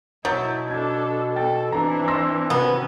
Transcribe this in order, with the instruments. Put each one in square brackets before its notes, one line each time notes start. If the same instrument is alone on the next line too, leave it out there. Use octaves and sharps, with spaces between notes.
[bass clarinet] B2 [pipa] F#3 [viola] E4 [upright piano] D#6 G6 A6
[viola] D4 A4 [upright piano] G#6
[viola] A4 [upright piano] G5 A6
[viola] E3 C4 [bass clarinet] D4 [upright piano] B4 A#5
[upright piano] C6 E6 A#6
[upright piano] C3 [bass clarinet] D#3 [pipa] B3 [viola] C#4 F#4